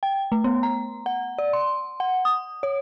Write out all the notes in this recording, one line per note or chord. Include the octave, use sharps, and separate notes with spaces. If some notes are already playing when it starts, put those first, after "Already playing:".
G5
A3
B3
A#5
F#5
D5
C6
F#5
D#6
C#5